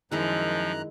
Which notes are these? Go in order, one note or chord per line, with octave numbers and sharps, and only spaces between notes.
F#2 D#3 F3 G#3 E4 A#5 F#6